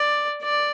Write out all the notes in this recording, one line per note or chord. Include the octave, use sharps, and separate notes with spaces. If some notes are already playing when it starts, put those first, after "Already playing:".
Already playing: D5
D5